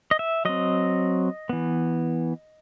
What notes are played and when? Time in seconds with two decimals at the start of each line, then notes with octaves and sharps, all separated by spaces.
0.11 D#5
0.19 E5
0.45 F#3 C4 D#5
1.49 E3 B3